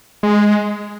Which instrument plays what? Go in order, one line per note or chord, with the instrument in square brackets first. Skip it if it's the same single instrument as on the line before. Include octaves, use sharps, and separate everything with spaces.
[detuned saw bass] G#3